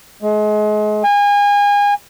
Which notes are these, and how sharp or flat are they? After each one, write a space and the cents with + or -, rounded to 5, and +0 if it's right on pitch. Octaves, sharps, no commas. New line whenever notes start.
G#3 +35
G#5 -30